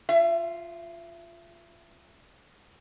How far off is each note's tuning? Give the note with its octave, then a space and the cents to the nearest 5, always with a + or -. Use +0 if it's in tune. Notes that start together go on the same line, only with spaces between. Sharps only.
F4 +0 E5 +30